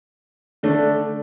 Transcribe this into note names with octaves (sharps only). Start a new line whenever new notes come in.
D3 A3 D4